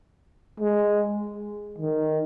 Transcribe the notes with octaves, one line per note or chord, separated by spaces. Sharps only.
G#3
D#3